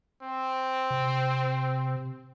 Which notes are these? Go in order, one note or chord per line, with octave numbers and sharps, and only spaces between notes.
C4
C3